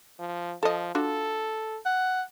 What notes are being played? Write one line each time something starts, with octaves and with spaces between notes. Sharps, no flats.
F3
F3 A4 D#5
D4 F4 F#4 A4
F#5